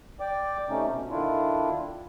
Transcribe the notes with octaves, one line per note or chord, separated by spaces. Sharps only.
D5 G5 D6
C3 A3 C#4 D#4
B2
D3 D#3 D4 E4 F4